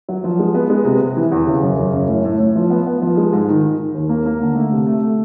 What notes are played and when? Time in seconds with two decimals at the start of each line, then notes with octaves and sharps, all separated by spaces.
0.09 F#3
0.24 F3
0.39 G#3
0.54 B3
0.70 G#3
0.85 C3
1.01 C3
1.17 E3
1.32 E2
1.47 C#3
1.63 F#2
1.78 C#3
1.93 F#2
2.08 A2
2.25 A2
2.39 A2
2.56 F3
2.70 B3
2.86 B3
3.02 F3
3.17 G#3
3.33 G#2
3.49 D#3
3.63 D#3
3.79 D#3
3.94 D#2
4.09 A#3
4.25 A#3
4.41 D3
4.56 A3
4.72 C3
4.87 A3
5.03 A3